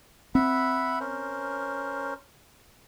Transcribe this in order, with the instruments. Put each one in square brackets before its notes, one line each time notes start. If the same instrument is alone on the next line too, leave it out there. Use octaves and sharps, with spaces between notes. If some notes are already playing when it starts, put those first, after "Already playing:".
[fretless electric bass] C4 [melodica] E5 F#5 B5
[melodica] C#4 A#4 C5